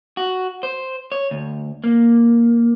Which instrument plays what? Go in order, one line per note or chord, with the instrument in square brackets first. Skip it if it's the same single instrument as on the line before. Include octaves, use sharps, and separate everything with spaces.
[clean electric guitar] F#4
C5
C#5
D2
A#3